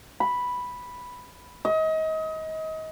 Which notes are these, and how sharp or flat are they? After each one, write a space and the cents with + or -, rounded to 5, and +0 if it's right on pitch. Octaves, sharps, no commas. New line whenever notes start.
B5 +0
D#5 +30